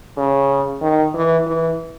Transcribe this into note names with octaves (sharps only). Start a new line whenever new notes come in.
C#3
D#3
E3
E3